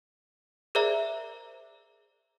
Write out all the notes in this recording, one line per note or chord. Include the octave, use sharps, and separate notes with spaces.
G#4 A#4 C5 D5 E5 A#5